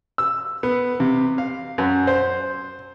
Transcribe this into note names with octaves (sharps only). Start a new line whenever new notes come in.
E6
B3
C3
F5
F#2
C5